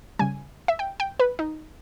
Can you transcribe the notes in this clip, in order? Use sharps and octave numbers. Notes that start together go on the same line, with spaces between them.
C#3 G3 G#5
E5
G5
G5
B4
D#4